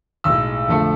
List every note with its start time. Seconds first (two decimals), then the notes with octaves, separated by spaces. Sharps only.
0.24 B1 A2 G#3 E6
0.67 F2 D3 F3 A3